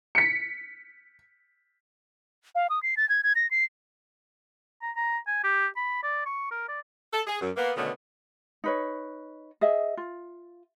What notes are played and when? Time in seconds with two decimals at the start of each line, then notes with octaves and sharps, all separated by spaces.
0.15 B6 C#7
2.55 F5
2.70 D#6
2.83 C7
2.97 A6
3.09 G#6
3.23 G#6
3.35 A#6
3.51 C7
4.82 A#5
4.96 A#5
5.27 G#5
5.44 G4
5.76 B5
6.03 D5
6.26 C#6
6.51 A#4
6.68 D5
7.13 A4
7.27 G#4
7.41 F#2
7.57 A#3 B3
7.76 B2 D3 D#3 A3 B3 C#4
8.64 D#4 B4 C#5
9.61 G#4 D#5 E5
9.97 F4